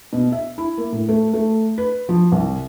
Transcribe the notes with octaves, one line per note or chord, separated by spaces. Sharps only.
B2
E5
E4
A#3
A2
A3
A3
B4
F3
C2